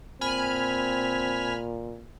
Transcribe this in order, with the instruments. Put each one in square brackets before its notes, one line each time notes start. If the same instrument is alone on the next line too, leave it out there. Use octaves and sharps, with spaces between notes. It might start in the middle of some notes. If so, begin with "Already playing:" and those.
[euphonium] A#2 [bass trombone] C4 [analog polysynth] G#5 B5 F6